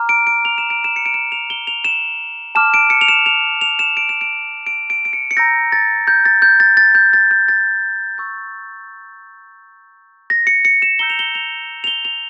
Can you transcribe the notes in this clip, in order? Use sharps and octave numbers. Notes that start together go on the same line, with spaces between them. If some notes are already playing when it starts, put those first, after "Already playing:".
Already playing: A#5 D6 F6
D7
D7
F7
E7
D7
E7
C#7
D7
E7
F7
G7
F7
E7
A5 D6 F6 E7
D7
C#7
F7
E7
F7
F7
E7
D7
E7
D7
D7
D7
D7
C#7
C#7
A#5 E6 G6 A#6
A6
G6
A6
G6
A6
A6
G6
A6
G6
A6
C#6 E6 G6
A#6
C#7
C#7
E7
A#5 E6 G6 G7
F7
G7
F7
F7
G7
F7